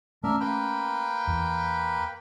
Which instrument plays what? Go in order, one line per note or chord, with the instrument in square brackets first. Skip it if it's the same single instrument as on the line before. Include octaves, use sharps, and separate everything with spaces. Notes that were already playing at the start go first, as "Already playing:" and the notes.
[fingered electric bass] A3 C#4 [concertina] D4 A#4 E5
[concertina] A#3 B4 G5
[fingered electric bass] E2